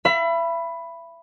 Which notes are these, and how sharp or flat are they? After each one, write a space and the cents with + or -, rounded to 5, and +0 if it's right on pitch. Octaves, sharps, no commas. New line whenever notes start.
E5 +35 B5 +0